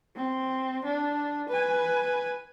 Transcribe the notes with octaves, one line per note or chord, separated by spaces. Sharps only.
C4
D4
B4 G#5